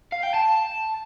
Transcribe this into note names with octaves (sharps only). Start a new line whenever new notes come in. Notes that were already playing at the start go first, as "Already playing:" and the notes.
F5
G5
A5